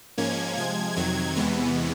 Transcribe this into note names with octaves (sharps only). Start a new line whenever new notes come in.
G#2 F3 A#3 C#4 G#6
C3 F3 G#3 G#6
F2 C3 D#3 F#3 G#6
E2 C3 E3 G#3 B3